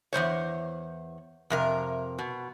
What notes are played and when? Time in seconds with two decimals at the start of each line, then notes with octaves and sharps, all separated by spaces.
0.13 E2 G3 C5 C#5
1.50 F2 C3 A#4
2.19 B2